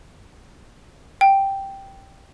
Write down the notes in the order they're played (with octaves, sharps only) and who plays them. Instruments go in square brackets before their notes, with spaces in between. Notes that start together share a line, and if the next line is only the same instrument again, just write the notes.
[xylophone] G5